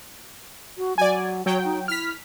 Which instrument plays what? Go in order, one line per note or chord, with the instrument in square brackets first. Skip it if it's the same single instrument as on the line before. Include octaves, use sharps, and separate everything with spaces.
[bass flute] F#4
[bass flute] F#3 [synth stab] D5 G#5
[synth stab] F#3 G5 [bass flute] C#5
[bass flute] D#4
[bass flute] E4 [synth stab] F6 B6